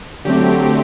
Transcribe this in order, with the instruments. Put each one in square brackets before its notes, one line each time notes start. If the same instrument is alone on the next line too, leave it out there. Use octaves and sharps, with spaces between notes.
[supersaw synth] D3 F#3 A3 C4 G4